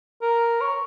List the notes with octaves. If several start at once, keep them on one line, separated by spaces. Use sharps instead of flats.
A#4
C#5